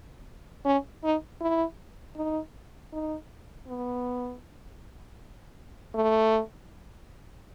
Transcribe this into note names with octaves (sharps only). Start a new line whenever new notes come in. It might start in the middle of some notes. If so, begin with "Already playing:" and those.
C#4
D#4
E4
D#4
D#4
B3
A3